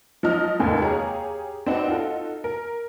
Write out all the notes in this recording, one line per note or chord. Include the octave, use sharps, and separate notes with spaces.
F3 F#3 D#4 D#5 F6
F1 D#2 G#2 D3 D#3
G4 G#4 C#5 F5 A#5
C4 D4 D#4 F#4 B4
D#4 F4 F#4 A4
A#4